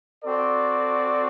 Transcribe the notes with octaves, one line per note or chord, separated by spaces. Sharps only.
C4 F#4 A4 D5